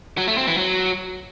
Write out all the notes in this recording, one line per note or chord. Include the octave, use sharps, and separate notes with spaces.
F#3
A3
C4
E3
F#3